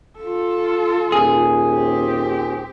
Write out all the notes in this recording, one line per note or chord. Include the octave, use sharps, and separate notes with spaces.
F4 A4
D#1 G#4
C4 G4